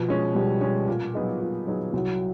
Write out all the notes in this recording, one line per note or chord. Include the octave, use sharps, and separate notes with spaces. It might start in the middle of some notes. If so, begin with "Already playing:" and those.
Already playing: B2 F3
G#3 C#4
B2 G3
G#3 C#4
A#2
F#3 B3 D#4 G#4
A#2
F#3 B3 D#4 G#4
C2 F#3